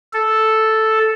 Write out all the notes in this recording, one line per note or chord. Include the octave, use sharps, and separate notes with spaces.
A4